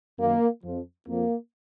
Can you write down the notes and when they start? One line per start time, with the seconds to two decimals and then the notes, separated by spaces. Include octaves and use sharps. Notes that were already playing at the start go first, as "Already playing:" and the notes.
0.19 F#2 D#3 A#3
0.63 F2 F3
1.07 F2 F3 A#3